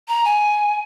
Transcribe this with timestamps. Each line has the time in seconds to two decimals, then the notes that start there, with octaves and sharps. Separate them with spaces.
0.08 A#5
0.25 G#5